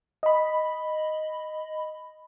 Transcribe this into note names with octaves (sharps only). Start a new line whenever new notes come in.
D#5 B5